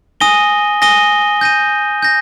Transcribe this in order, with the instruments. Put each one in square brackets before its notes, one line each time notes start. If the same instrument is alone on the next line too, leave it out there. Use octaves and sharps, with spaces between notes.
[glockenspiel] G#5 D#6 A#6 D#7 G7
G#5 D#6 A#6 D#7 G7
G6 A#6 D#7
G6 A#6